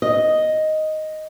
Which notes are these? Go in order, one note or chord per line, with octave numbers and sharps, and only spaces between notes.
D#5